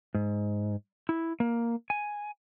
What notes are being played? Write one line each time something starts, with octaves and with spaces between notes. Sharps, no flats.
G#2
E4
A#3
G#5